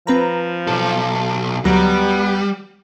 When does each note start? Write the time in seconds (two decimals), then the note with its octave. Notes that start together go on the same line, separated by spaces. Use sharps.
0.07 F3 C4 B4 A#5
0.68 B1 A4
1.65 D2 F#3 G3 B3 A#5